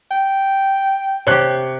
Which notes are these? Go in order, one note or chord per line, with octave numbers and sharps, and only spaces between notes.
G5
C3 G4 C#5 F#6